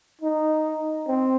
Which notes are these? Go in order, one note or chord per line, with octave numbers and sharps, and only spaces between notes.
D#4
C4